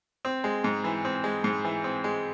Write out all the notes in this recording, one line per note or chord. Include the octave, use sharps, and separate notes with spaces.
C4
G#3
G#2
E3
C4
G#3
G#2
E3
C4
G#3